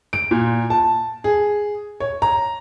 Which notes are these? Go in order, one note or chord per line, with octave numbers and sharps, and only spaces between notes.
D7
A#2
A5
G#4
C#5
A#5